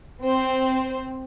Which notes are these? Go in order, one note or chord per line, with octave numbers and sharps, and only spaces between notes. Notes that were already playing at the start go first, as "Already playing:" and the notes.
C4 C5